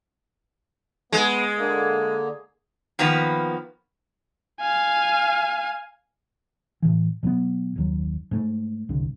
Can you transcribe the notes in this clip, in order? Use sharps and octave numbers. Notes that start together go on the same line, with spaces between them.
G#3 B3
D3 A#3
D#3 F3 A#3 B3 B4
F5 G#5
A2 E3
B2 F#3 A#3 B3
F#1 D#2 F#3
G#2 A3
F#1 C2 G2 D3